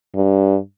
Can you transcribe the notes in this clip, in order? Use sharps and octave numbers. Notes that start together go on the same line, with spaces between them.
G2